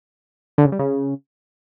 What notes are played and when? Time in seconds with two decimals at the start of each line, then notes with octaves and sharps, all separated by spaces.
0.58 D3
0.65 C#3
0.72 G3
0.79 C#3